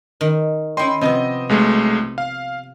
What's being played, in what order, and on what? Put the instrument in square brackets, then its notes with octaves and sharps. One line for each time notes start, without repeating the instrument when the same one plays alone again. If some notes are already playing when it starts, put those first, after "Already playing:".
[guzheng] D#3
[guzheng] C#4 E4 D#5 [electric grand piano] G5 C6
[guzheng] C3 F3 B3 [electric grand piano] C4 D#5
[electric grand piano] B1 G#3 A3
F5